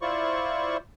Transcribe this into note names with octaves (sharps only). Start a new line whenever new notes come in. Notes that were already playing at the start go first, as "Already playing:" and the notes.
E4 F4 C5 D5 C#6